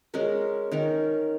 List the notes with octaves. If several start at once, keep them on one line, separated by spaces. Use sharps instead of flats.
G#3 C#4 A#4
D#3 C#4 A#4